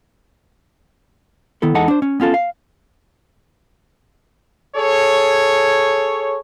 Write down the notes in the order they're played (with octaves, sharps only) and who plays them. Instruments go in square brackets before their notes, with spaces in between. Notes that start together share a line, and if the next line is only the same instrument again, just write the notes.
[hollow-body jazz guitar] D#3 B3 E4 A4
E2 E3 G#3 D#4 A4 F#5
D4 C5
C#4
B3 C#4 F4 A4
F5
[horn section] G#4 A4 C#5